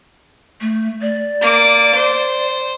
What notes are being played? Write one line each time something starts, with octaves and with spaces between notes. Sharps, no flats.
A3
D5
A#3 D6
C5